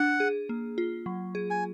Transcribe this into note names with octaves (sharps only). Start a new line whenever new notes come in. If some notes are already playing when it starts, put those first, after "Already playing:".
Already playing: D4 F#5
G#4
A#3
F4
F#3
G#4
G#5